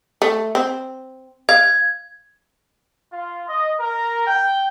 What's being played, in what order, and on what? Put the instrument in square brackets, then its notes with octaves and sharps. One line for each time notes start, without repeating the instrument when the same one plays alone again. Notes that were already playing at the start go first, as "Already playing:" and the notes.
[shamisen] A3
C4
[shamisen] F5 [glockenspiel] G#6
[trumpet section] F4
D#5
A#4
G5